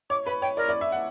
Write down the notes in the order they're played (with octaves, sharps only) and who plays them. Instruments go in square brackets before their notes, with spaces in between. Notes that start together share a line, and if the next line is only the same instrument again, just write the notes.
[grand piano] C#5 [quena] D6
[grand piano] B4 [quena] B5
[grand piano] C#5 [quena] G5
[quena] A#4 [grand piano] D5
[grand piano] D5
E5
F#5